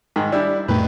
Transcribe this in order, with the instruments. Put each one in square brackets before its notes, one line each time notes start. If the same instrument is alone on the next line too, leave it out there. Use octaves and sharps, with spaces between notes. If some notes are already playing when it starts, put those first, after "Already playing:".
[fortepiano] G#2 D#3
G3 D4 E4
[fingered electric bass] F2 A2 A3 [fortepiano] D#3 B4